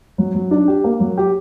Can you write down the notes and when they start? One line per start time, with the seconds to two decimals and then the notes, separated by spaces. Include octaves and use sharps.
0.18 F#3
0.35 F#3
0.51 D4
0.68 G4
0.84 A#3
1.00 F#3
1.17 G4